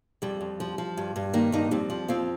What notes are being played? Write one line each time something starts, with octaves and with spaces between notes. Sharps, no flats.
F2 G3
F2
F3
F3
G2
G2
D#3 A#3
G2 A#3 D#4
F2 G3 C4
F3
F2 C4 F4